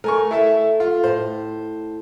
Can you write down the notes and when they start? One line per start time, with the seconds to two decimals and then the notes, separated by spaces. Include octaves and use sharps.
0.04 A3 A#4 G#5 C#6
0.31 E4 A4 E5
0.80 F4
1.04 A2 C5